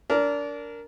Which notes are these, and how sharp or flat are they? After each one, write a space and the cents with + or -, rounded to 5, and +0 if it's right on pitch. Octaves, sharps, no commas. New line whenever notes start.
D4 -25 A#4 -5